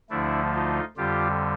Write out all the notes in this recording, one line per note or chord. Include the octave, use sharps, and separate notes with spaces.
D2 D3 F3 A3 D4 E4
D#4 F4
F2 D3 G3 F4 G4